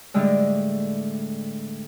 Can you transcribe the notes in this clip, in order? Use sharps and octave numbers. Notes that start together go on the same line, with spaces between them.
A2 D3 G3 G#3